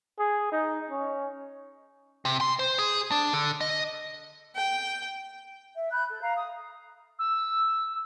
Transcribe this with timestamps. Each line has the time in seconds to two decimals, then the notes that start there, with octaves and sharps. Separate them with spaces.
0.19 G#4
0.52 D#4
0.90 C#4
2.25 C3
2.41 C6
2.59 C5
2.78 G#4
3.11 D4
3.33 D3
3.61 D#5
4.56 G5
5.76 E5
5.91 B5 F#6 G6
6.10 A4
6.22 F5 A#5
6.36 D#6
7.18 E6